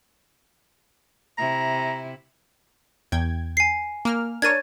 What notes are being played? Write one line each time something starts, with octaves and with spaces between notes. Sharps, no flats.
C3 E4 A#5
E2 G5 G#6
G#5 C7
A#3 F6
D4 A#4 C#5 G#6 A6 D#7